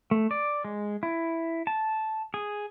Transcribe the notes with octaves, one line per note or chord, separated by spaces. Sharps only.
A3
D5
G#3
E4
A5
G#4